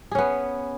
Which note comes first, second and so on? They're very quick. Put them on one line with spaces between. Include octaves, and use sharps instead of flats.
G#4 C#4 B3